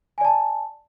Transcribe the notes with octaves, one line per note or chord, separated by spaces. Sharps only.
D5 G#5 A5